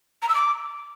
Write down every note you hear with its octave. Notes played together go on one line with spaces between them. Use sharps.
A#5
E6
D6